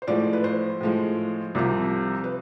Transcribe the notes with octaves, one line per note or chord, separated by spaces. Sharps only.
C5
A2 F3 G#3 D5
B4
C5
A2 F3 G#3
C2 C3 F3
B4